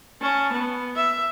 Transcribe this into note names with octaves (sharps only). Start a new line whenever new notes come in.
C#4 A5
B3
E5